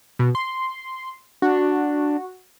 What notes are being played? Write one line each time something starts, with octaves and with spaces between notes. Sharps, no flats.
B2
C6
D4 F#4